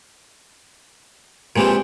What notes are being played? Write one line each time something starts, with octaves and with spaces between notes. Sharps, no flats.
A#2 E3 F3 G#3 C4 G4